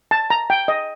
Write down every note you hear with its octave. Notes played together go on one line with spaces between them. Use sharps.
A5
A#5
G5
D#5